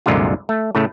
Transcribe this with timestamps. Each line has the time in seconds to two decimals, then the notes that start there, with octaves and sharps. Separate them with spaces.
0.06 C2 F#2 A#2 D3 G#3 F4
0.49 A3
0.75 A2 C#3 A3